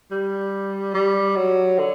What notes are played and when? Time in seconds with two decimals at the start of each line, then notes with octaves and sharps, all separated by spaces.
0.11 G3
0.94 G3
1.36 F#3
1.79 D3